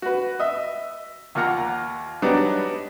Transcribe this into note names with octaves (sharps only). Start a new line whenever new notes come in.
F#4 B4
D#5 E5
D#2 A#3 F4 F#5 A#5
F#3 G3 B3 D4 D#4